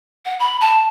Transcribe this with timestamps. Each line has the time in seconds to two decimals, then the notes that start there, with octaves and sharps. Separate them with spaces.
0.25 F#5
0.39 B5
0.60 A5